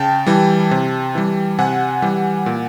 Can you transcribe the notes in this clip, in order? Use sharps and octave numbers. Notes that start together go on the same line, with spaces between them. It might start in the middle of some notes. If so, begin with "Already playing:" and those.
Already playing: C#3 G5 A5
E3 G3
C3
E3 G3
C3 F#5 G#5
E3 G3
A#2